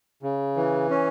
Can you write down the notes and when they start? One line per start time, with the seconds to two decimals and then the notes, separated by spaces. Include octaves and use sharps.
0.23 C#3
0.57 E3
0.90 C#4